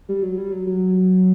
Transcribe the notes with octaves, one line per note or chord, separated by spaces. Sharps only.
G3
F#3
G3
F#3
F#3